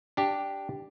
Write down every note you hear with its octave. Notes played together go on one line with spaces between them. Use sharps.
D4 G4